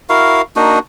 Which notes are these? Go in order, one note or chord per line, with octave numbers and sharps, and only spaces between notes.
E4 F#4 A#4 F5
A#3 D4 D#4 F#4